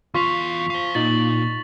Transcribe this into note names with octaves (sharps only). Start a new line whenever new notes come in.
E2 F4 F5 C6 C#6 B6 F7
C5 F5 C#6
A#2 D#4 F4 A6 F#7